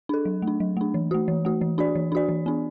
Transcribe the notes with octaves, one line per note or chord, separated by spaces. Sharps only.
D4 A4
F#3
A3
D4
F#3
A3 D4
E3
A3 F#4
E3
A3 F#4
E3
D4 F#4 D5
E3
D4 F#4 D5
E3
B3 D4